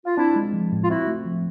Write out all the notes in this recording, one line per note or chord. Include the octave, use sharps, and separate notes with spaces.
F4
C4 D4 E4
G#3
F3
A2
F4
C4 E4 F#4
A3
F3